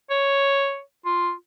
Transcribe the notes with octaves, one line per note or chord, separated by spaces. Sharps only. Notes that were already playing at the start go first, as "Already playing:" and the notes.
C#5
F4